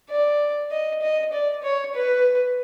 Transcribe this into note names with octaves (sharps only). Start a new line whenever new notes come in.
D5
D#5
D#5
D5
C#5
B4